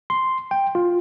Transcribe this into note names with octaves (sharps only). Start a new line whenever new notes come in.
C6
G5
F4